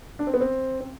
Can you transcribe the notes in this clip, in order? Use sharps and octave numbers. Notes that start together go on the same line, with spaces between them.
D4
C4
B3
C4
C4